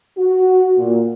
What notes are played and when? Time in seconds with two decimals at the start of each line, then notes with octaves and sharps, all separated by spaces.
0.18 F#4
0.78 A#2